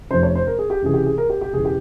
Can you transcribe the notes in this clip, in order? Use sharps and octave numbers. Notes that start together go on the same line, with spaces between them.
F1 F2 C3 C5
C#5
C5
A#4
G#4
G4
C#2 C3 E3 G#4
G4
G#4
A#4
G4
G4
E1 C#3 E3 G#4
G4